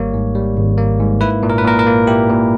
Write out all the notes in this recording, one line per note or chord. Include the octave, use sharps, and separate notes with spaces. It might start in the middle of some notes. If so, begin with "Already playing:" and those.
Already playing: G#1 G3 A#3 C#5
G#2
G3
G#1
A#3
G#2
E4 B4
A#2
A#4
B4
A#2 A#4
A#4
A#3
E4 G4
A#2